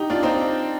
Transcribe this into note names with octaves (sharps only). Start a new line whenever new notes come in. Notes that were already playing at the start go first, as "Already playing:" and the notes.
Already playing: D#4 G4
D4 F4
C4 D#4